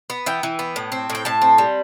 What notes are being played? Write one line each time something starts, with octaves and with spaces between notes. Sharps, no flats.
B3
E3 G5
E3
B3
A2
C4
A2
G5
A2 A5
C4
G3